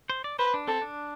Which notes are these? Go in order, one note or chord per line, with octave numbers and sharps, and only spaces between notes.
C5
D5
B4 C5
D4
C4 A4
D4